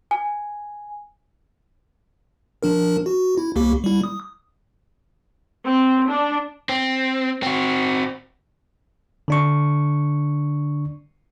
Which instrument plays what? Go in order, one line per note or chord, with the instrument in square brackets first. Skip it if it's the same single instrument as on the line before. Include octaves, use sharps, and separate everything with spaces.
[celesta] G#5
[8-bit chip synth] F3 D4 A#4
F#4
E4
C2 A#3 G4
G3 E4
D#6
[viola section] C4
D4
[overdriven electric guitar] C4
C4 F#4
[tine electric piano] D3 D4 C#6